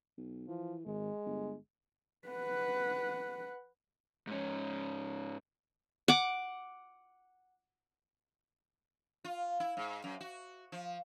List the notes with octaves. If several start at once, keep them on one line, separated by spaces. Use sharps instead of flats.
B1
E3 F3
G#1 G#3
G1
B4 F#5
G#2 C#4
F#5 D6
F4
E4
G#2
F#2
F#4
F3